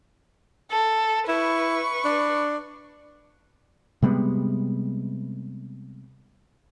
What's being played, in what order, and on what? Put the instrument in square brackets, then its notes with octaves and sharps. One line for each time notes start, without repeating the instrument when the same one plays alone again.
[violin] A4
[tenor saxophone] E4 [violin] B4 C#6
[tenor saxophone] D4
[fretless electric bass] C3 G3 G#3 B3